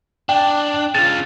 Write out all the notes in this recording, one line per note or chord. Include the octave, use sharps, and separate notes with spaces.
D4 G5
C#3 F4 A6